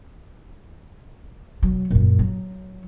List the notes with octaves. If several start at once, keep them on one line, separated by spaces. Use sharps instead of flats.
B2 F#3
F#2 A#2
F#3